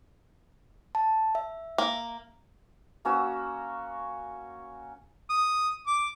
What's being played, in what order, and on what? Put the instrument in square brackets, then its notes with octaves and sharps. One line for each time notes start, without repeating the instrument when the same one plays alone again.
[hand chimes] A5
E5
[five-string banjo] A#3
[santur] A#3 C#4 F#4 E6
[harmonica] D#6
D6